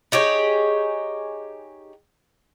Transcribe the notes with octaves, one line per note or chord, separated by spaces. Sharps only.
D#4 G4 G#4 C#5